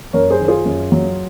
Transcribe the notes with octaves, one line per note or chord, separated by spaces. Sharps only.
F#2 A#4 C#5
G#4 C5
D#3
F4 G#4
F#2
F#3